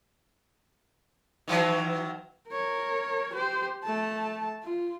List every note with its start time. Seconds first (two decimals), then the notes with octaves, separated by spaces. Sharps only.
1.48 D#3 E3 F#3
2.49 A#4 C#5
3.34 G4 C5
3.84 A3 A5
4.64 F4